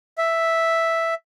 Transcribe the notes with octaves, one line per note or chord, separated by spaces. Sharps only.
E5